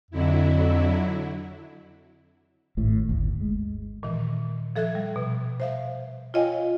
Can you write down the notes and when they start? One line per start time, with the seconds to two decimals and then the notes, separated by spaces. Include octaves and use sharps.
0.11 F2 D3 F#3 E4
2.77 G#1 A2
3.09 G1 D2
3.41 G#3
4.03 A#2 D#3 E3
4.76 F3 A4 E5 F#6 G#6
4.95 G3
5.16 B2
5.60 C5 E5 F5
6.34 F4 C#5 D#5 F5 G5 G#5